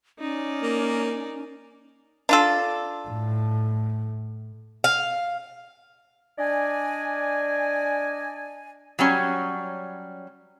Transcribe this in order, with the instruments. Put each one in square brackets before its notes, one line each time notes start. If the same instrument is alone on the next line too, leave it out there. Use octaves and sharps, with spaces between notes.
[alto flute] C#4 [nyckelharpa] D#4 D5
[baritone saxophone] A#3
[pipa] D4 F4 A4
[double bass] A2
[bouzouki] F5
[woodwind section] D4 D5 D#5 G#5
[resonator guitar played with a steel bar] F#3 G3 C#4